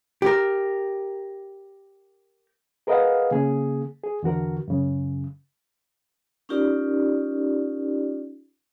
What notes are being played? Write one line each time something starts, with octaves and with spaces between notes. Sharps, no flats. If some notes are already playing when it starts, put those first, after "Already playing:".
G4 A#4
G#4 A#4 B4 D#5 F5 F#5
C#3 A#3 G#4
G#4
E2 D3 F#4 A#4
F#2 C#3
C#4 D#4 F4 G4 A#4 D5